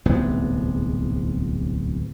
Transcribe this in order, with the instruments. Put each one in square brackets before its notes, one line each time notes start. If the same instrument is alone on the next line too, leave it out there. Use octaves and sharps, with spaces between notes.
[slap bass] D1 C2 G#2 B3